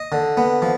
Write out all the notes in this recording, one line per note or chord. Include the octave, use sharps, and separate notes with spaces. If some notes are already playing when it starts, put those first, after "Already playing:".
Already playing: D#5
D3
B3
F3